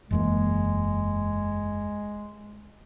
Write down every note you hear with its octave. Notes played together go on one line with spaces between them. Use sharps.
F#1 E2 G#3 A#3